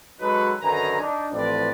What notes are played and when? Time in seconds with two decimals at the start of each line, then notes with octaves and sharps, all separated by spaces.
0.20 F#3 G#3 D#4 F#4 A4 B4
0.62 F#2 D3 D#3 B4 G#5 A#5
1.00 D4 D#4
1.33 A1 A2 F3 C4 B4 D5